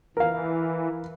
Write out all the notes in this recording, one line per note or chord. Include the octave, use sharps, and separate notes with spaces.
E3 A#4 F5